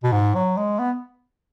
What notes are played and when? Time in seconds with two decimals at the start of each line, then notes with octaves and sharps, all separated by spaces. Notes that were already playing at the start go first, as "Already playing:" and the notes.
0.03 B2
0.12 G#2
0.35 F#3
0.57 G#3
0.79 B3